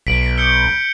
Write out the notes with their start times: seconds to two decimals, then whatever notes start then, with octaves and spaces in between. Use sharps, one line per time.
0.07 B1 B6 D7 F#7
0.38 G6 C#7 G7